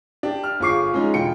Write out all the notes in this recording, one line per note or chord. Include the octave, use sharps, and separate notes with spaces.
D4 G4
F6
G1 F4 G#4 C#6 D6 C7
F3 G#3 C#4 D#4
E1 F4 G5 C#7